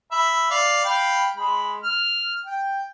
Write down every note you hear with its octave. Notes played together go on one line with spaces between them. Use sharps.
E5 B5
D5 F5
F5 G5 B5
G#3 B5
F6
G5